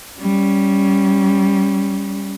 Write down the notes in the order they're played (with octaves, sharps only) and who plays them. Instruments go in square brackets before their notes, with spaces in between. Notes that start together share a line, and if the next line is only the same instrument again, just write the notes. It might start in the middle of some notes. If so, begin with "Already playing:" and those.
[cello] G3 C#4